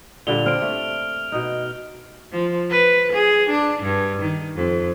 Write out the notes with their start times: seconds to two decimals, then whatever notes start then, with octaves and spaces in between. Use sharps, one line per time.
0.27 A#2 D3 G3 F7 G7
0.46 C4 D4 F6 D7
0.62 A3
1.32 B2 D#4
2.32 F3
2.70 B4
3.12 G#4
3.49 D4
3.82 G2
4.22 D#3
4.56 F2